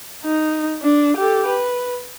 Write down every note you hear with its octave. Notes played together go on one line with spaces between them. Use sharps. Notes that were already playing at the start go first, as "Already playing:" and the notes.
D#4
D4
G4 A4
B4